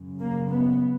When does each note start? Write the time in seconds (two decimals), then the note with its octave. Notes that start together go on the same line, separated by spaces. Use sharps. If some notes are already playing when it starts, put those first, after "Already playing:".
Already playing: F#2 C#3
0.19 A#3
0.50 B3